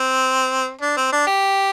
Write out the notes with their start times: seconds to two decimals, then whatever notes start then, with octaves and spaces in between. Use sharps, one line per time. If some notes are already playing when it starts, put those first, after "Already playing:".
Already playing: C4
0.81 D4
0.97 C4
1.13 D4
1.27 G4